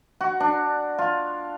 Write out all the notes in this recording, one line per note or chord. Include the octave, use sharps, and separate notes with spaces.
F#4
D4
F4